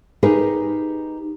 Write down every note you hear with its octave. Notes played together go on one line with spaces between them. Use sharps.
D#4 G4 G#4 A#4 B4